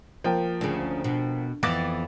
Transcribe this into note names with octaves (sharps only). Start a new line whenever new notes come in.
F3 A#3 G5
D2 C#3
B2
F2 E3 B3 D6 A6